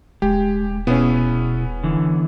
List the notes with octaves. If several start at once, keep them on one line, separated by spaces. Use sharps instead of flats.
D#1 G#3 G4
B2 B3 C#4 E4 G#4
D3 E3